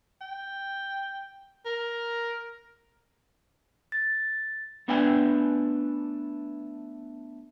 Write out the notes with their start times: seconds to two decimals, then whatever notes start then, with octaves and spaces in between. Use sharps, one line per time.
0.21 G5
1.66 A#4
3.92 A6
4.88 A3 B3 D4 B4 G5 G#5